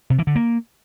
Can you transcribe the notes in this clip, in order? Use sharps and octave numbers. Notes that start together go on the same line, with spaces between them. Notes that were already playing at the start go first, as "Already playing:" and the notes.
C3
E3
D3
A#3